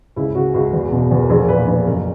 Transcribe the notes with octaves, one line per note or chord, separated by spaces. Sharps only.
C#2 E4
C#3 F#4
C#2 F#4
E2
B2
E2
A#4
A#1 G#4
A#4
A#2 B4
A#1 B4
F#1 A#4